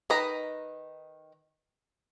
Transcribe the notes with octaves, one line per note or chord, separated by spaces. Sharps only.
D#3 D#4 B4 D#5 A#5